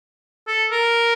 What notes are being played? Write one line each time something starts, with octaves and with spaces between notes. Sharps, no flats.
A4
A#4